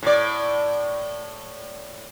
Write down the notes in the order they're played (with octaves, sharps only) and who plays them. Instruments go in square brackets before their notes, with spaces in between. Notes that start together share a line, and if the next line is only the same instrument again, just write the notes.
[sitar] A2 D5